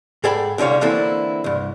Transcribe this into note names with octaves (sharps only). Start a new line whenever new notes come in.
G#2 G#4 A4 D5 G5 B5
C2 D3 G3 C#5 F5
D3 E3 A#3 C4 E4 A4
C2 G2